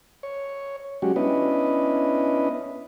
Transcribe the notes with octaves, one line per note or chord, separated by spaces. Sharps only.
C#5
F#3 G#3 C#4 F#4 G4
B3 C#4 D4 E4 B4 D#5